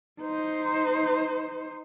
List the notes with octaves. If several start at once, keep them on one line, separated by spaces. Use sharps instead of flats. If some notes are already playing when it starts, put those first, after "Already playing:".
D#4 C5